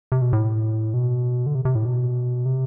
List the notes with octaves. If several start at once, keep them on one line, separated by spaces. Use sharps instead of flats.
C3
B2
A2
B2
D3
C3
C3
A2
B2
C3